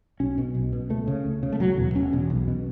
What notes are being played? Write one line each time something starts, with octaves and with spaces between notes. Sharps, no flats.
B1 C#4
B2
B1
B2
C#2 A3
C#3
C#2
C#3
A3
E1 F#3
E2 B2
E1 C#4
E2 B2
B1
B2